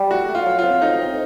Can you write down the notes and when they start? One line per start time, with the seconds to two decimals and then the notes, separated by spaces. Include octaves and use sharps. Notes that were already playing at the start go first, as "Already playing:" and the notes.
Already playing: G3
0.11 A3 F#4
0.28 A3
0.35 F4
0.46 F#3
0.59 F4
0.64 C4
0.82 A2 D#4
0.99 C4